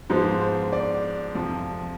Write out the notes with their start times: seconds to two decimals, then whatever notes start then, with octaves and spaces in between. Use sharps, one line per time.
0.10 G#2 F3 G#3 B3 C5
0.41 C5
0.72 D5
1.35 F2 C3 F3